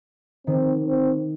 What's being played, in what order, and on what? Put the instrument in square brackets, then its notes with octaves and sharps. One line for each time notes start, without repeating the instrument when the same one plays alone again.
[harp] D#3 [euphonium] C4
[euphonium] C4